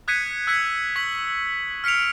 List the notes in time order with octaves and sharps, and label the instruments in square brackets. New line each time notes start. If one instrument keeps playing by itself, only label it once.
[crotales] D#6 F#6 G#6 B6 C#7 D#7
E6 F#6 G#6 B6 C#7
C#6 B6 F#7
F6 B6 C#7 D7 F7